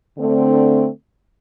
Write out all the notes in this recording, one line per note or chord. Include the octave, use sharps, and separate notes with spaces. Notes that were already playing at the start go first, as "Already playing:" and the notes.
D3 A3 C4